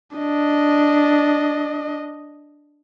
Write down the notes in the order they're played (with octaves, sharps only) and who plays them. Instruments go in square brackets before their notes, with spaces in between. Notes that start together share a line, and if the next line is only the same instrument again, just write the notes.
[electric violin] D4 D#5